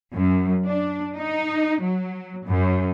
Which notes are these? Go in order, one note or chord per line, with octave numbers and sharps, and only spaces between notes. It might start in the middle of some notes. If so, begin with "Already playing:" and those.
F#2
D4
D#4
F#3
F#2